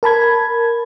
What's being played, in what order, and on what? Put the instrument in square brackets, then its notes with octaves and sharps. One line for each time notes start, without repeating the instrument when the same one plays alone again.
[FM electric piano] A#4 A5 B5 G#6